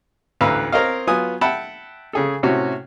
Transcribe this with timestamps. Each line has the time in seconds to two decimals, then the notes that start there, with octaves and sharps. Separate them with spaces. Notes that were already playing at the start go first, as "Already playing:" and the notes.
0.41 A1 D2 B4 F5 A#5 E6
0.72 C4 A#4 C#5 D#5 F5
1.07 F#3 B3 F4 G#5 D#6
1.41 E5 F#5 G5 A5 B5
2.13 C#3 G#4 A4
2.43 A2 C3 C#4 F#4